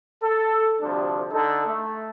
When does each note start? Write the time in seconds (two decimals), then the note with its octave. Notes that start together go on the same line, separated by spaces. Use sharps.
0.21 A4
0.81 D2 C3 F3 G3 D4
1.31 D3 D#4 A4
1.66 A3